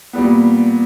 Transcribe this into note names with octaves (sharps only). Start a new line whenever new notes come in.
A#2 G3 B3